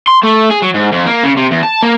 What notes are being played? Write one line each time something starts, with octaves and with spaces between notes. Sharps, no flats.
C6
A3
G#4
F#3
G#2
F2
A#3
C#3
C3
E2
A5
A#3